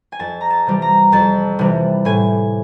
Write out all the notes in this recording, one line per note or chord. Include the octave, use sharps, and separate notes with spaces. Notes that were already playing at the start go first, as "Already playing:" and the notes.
G#5
F2 A5
A#5
A5
C3 E3 G3
A#5
F2 A5
C3 E3 G3
A2 G#5